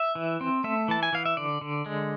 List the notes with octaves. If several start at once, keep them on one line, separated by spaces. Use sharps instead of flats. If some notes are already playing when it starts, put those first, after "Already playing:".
Already playing: E5
E3
C4
A3 E5
E3 A5
G#5
E3 F5
E5
D3 D5
D3
G#3